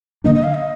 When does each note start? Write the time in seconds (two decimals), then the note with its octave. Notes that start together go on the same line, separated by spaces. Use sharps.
0.24 D3 F3 A#3 D4 D#5
0.35 D#5
0.44 F5
0.54 D#5